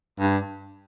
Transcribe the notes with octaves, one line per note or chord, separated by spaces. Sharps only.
G2